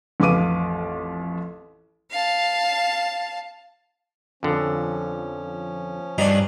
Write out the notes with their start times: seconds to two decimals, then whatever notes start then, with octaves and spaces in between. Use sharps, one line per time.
0.20 A1 F2 B4 F5 D6 D#7
2.10 F5 A5
4.43 F2 D3 F3 C#4
6.18 G2 D4 D#4